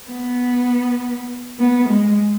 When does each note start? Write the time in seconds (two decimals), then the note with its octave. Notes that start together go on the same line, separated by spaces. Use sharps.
0.10 B3
1.59 B3
1.89 G#3